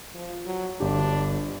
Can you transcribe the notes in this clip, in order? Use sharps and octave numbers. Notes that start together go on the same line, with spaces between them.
F3
F#3
G1 D4 G4